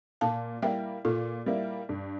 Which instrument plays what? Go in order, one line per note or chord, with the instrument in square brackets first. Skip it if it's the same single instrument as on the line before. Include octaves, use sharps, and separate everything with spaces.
[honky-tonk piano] A#2 [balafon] F5 A5
[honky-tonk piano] G3 A#3 E4 [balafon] E5 G5
[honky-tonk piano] A#2 [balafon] F4 A4
[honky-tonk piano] G3 A#3 E4
G2